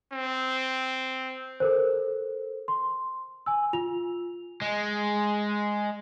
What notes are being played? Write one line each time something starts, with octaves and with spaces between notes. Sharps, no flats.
C4
A4 A#4 C5
C6
G#5 E6
F4 F7
G#3